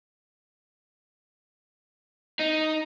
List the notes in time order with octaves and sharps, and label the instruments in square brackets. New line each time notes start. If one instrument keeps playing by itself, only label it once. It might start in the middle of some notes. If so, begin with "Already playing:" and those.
[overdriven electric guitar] D#4